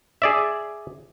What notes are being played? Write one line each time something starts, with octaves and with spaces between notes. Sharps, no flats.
G#4 D5 E5